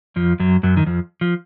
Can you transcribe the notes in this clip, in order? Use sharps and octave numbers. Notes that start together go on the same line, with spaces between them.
F2 F3
F#2 F#3
F#2 F#3
D#3
F2 F3
F3